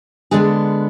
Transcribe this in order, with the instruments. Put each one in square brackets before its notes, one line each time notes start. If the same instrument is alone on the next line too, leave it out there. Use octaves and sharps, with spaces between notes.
[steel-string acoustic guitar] D3 G#3 B3 D4 G#4